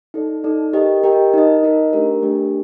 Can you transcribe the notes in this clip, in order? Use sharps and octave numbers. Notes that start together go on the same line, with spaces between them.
D#4 A4 D5
D#4 A4 D5
G4 A#4 D#5 G5
G4 A#4 D#5 G5
D#4 A#4 D#5
D#4 A#4 D#5
A3 D4 G4 A#4
A3 D4 G4 A#4